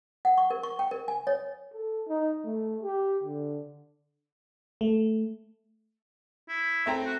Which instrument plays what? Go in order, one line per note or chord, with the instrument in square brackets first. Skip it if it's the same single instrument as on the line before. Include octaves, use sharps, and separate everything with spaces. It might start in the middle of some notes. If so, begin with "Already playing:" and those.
[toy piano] F#5
C#6
A#4
C#6
G5
A#4
G#5
C#5
[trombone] A4
D#4
A3
G4
D3
[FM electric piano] A3
[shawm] E4
[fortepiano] A3 C4 A#5 [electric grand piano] E5 G5
[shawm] F#4